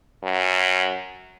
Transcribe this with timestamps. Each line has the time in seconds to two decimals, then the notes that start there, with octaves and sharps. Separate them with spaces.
0.23 F#2